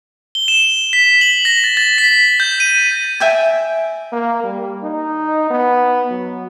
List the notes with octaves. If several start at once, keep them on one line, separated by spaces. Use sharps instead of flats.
G7
E7
B6
F#7
A#6
A6
A6
B6
G6
D#7
E5 G5 G#5
A#3
G3
D#4
B3
F#3